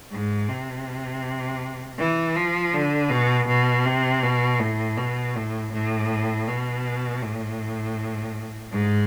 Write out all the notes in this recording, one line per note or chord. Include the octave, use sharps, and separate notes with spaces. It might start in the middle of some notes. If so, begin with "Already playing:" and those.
G#2
C3
E3
F3
D3
B2
B2
C3
B2
A2
B2
A2
A2
B2
A2
G#2